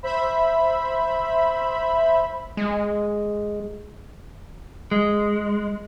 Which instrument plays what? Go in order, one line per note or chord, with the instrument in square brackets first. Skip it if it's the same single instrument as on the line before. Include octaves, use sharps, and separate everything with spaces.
[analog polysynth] C5 E5 B5
[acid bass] G#3
[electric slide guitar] G#3